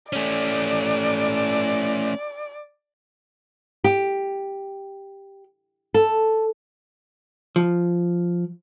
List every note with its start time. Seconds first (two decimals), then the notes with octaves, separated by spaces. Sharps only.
0.13 A3 C#4 D5
3.84 G4
5.94 A4
7.56 F3